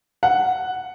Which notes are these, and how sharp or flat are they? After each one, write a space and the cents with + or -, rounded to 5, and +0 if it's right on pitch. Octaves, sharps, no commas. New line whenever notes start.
F#5 +0